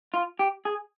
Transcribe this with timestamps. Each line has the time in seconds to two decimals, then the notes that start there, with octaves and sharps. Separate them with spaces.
0.14 F4
0.39 G4
0.65 G#4